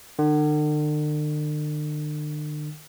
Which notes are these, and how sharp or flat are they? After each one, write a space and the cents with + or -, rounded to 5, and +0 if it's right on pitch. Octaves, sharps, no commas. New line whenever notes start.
D3 +45